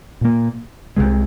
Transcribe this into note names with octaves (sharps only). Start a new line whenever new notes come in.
A#2 A#3
C2 C3 G#3